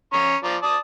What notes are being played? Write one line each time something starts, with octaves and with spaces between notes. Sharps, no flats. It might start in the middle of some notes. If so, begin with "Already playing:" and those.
C#4 A#5 C#6
F3 D5 A#5
D5 A5 D#6